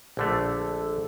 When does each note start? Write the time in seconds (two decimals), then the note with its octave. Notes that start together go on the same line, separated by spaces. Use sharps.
0.17 A#1 D3 A3
0.54 A4